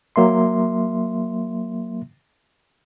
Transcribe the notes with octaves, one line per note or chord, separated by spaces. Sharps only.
F#3 A#3 E5 C6